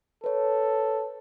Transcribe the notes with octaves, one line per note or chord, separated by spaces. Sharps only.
A4 B4 C#5